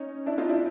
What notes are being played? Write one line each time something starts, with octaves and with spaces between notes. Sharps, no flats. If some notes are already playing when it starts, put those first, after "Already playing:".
Already playing: C#4 D#4
D4 E4
D#4 F4
D4 E4